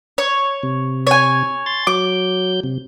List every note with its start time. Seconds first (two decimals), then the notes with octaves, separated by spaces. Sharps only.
0.18 C#5
0.63 C3
1.07 C#5 G#5
1.66 C6 A6
1.87 F#3 D6 G6
2.64 C3